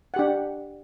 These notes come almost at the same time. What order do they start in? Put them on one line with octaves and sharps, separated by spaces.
F#5 G4 D4